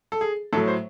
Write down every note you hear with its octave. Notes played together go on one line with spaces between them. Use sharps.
A4
G#4
A2 F#3 A4
C5